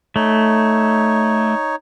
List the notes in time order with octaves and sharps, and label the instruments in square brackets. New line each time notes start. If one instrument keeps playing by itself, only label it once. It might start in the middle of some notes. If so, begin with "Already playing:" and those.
[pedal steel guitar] A3 [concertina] D#4 C#5